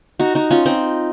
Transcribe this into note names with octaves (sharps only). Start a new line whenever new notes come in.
D#4 F#4
D#4 F#4
C#4 F4
C4 D#4